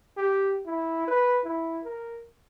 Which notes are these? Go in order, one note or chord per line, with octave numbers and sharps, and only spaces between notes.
G4
E4
B4
E4
A#4